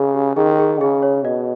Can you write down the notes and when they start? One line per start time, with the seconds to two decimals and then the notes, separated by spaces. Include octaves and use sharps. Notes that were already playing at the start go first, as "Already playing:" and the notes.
Already playing: C#3 G#4
0.14 G4
0.36 D#3 G#4
0.59 G#4
0.80 C#3 G#4
1.03 C#5
1.24 B2 D#5